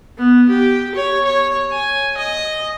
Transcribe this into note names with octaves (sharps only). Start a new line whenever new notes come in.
B3
G4
C#5
C#5
G#5
D#5